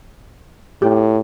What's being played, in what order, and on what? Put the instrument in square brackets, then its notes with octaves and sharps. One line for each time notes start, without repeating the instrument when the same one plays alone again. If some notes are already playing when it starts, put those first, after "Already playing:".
[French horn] A2 [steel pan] G4